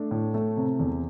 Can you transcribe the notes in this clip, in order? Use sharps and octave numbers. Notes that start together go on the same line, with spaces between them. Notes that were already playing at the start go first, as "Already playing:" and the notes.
Already playing: A3 D4 D5
A2
A3
C3
E2